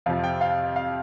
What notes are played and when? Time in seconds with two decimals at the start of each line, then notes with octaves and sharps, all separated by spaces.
0.06 F2 C3 F3 F5
0.24 G5
0.41 F5
0.76 F5